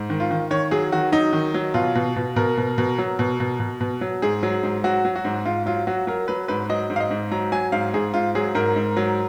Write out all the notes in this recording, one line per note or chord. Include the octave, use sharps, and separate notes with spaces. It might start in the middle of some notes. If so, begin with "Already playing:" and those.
Already playing: G#2
D#3
F4
D#3
D#3 C#5
F#3 G#4
D#3 F#4
F#3 D#4
D#3
F#3
B2 F4
B2
B2
B2 A#4
B2
B2
F#3
B2
B2
B2
B2
F#3
G#2 G#4
F#3
G#2
F#3 F#4
F#3
F#4
G#2
G#2 F4
F#3 F4
F#3 F#4
F#3 A#4
F#3 B4
G#2 B4
F#3 D#5
G#2
F5
D#5
G#2
F#3 A#5
F#3 G#5
G#2 F5
G#2 G#4
G#2 F4
F#3 G#4
G#2 A#4
G#2
F#3